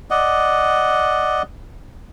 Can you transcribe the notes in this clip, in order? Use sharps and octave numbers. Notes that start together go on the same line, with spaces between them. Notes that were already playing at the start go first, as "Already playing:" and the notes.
D5 D#5 F#5